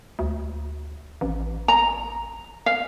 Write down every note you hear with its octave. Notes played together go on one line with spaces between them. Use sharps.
D2
A1
A#5
F5